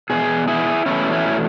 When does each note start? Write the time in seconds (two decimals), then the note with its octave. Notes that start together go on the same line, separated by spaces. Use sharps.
0.10 E2 B2 G#4
0.47 E4 G#4
0.86 E2 B2 A3 C#4 E4
1.12 C#4 E4